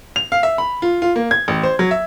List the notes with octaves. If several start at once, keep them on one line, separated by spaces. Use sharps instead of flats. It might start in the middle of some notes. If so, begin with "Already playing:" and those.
F7
F5
E5
B5
F4
F4
A#3
G#6
A1
C5
F#3
E5